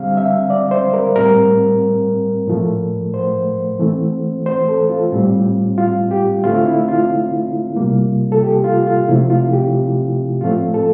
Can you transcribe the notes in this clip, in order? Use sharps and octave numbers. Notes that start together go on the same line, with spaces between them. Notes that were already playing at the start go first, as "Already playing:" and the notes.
Already playing: D3 G3 C4 F5
E5
D5
C5
A#4
A2 G3 C4 A#4
A2 F3 A3
C5
E3 A3 C4
C5
A4
F4
A2 G3 C4
F4
G4
D3 A3 C4 F4
E4
F4
C3 G3 A#3
A4
G4
F4
F4
C3 F3 A3 C4 E4
F4
G4
A2 F3 A3 C4 F4
A4